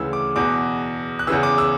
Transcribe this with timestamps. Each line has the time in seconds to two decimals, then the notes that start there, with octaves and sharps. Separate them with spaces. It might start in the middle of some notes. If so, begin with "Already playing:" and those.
Already playing: D2 C#3 E3 E6
0.13 D6
0.36 E2 B2 D6
1.19 F#6
1.27 E2 C#3 E3 E6
1.43 D6
1.58 E6